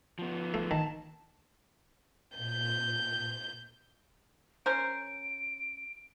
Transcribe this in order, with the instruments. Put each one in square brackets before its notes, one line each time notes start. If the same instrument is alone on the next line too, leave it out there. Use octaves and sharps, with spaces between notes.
[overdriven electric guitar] F3 B3
[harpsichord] A3
[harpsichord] D#3 [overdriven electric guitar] A5
[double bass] A#2 [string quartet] G6
[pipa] C#4 A#4 C5 [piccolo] D7